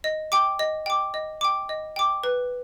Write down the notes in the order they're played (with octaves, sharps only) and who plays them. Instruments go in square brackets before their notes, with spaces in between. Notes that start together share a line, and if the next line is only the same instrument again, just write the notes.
[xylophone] D#5
G5 D6
D#5
G5 D6
D#5
G5 D6
D#5
G5 D6
B4